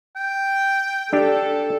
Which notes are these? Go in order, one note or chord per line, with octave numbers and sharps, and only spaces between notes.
G5
D4 G4 A4